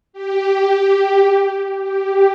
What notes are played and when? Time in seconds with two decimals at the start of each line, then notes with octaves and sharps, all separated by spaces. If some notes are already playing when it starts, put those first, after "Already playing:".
0.13 G4
1.79 G4